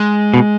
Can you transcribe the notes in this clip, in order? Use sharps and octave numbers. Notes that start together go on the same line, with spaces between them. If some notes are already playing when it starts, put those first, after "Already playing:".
Already playing: G#3
B2